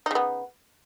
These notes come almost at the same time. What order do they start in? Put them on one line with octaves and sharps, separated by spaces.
D#4 C#3 B3